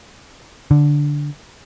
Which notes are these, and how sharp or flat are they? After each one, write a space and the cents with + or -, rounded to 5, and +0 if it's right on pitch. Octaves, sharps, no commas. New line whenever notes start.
D3 -5